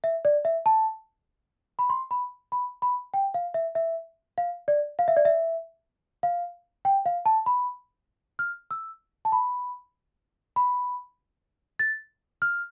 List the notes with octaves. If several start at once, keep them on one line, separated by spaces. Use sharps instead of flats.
E5
D5
E5
A5
B5
C6
B5
B5
B5
G5
F5
E5
E5
F5
D5
F5
E5
D5
E5
F5
G5
F5
A5
B5
F6
E6
A5
B5
B5
A6
F6